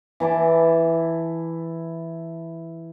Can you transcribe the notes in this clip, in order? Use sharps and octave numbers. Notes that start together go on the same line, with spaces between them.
E3 E4 A5 D6